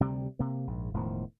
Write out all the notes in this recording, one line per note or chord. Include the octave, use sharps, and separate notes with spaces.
D2 C3 G3
C3 A#3
A#1 G#2
E1 A2 D#3 F3